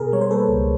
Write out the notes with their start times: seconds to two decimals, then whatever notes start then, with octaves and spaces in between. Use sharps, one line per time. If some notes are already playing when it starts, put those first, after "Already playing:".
Already playing: B2 G#4 A#4
0.12 G3 C#5
0.21 C5
0.31 A#3 A4 B4
0.48 C#2